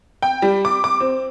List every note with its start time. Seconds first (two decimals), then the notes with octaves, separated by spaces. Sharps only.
0.22 G5
0.42 G3
0.65 D6
0.84 D6
1.00 C4